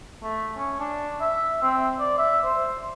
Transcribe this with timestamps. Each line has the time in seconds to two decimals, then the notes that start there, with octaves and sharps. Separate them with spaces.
0.23 A3
0.57 C#4
0.80 D4
1.20 E5
1.62 C4
2.00 D5
2.18 E5
2.44 C5